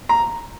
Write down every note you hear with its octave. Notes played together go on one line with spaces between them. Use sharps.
A#5